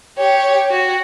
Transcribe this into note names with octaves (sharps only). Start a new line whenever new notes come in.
G4 C#5
F#4